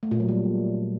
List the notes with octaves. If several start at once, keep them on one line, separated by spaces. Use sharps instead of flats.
A3
A#2
F#3
G3